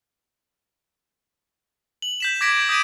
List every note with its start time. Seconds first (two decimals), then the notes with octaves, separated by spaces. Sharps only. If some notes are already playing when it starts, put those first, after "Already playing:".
2.02 F#7
2.20 G6 B6 E7
2.41 D6 G#6 A#6 B6 D7
2.69 D#6 G6 A#6 D7 D#7